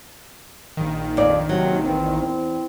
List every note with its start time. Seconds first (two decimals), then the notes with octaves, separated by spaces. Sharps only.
0.77 A#1 D#3
1.17 F2 D5
1.49 C3 F#3
1.85 E2 C4
2.19 C4